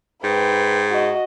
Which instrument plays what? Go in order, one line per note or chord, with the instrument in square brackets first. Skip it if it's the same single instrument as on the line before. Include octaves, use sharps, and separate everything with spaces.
[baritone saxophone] G#2 [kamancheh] B4 G5
[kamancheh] F#4 D#5